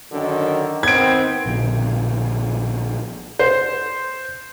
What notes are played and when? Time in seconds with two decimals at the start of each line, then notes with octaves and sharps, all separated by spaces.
0.12 F#2 D3 D#3
0.83 D#3 B3 C4 G#6 D7
1.46 A#1 B2 D3
3.39 C5